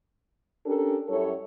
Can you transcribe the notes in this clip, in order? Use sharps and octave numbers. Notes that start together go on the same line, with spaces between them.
C#4 D4 G4 A4 A#4
F#2 G3 E4 A4 C#5